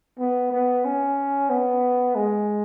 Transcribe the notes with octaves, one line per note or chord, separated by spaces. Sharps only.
B3
B3
C#4
B3
G#3